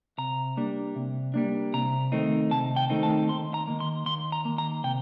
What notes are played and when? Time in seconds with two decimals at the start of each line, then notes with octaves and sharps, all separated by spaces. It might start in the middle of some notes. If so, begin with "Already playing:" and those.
0.18 C3 A#5
0.57 G3 A#3 D4
0.96 C3
1.34 G3 A#3 D4
1.74 C3 A#5
2.12 D#3 A3 C4 D#4
2.51 C3 A5
2.76 G5
2.90 D#3 A3 C4 D#4
3.03 A5
3.29 D#2 C6
3.54 A#5
3.68 D#3 A#3
3.80 C6
4.06 D#2 C6
4.32 A#5
4.45 D#3 A#3
4.58 A#5
4.84 C3 G5